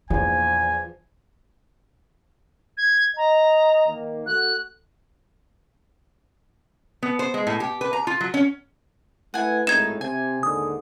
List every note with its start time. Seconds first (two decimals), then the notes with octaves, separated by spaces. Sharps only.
0.10 A#1 E2 F3 A#3 G#5
2.77 G#6
3.17 D#5 A#5
3.88 D#3 A#3
4.27 A3 F#4 F#6
7.03 B3
7.19 C5
7.34 G#3
7.47 A2
7.60 G4
7.81 B4
7.93 A#5
8.07 F4
8.21 F#3
8.34 C#4
9.34 A3 E4 B4 F#5 G#5
9.67 G#1 A2 G#3 D#4 G#6 E7
10.01 C3 G#5
10.43 D#2 G#2 D3 D#6